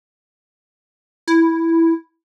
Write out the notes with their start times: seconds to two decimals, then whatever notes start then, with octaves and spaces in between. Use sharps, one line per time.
1.28 E4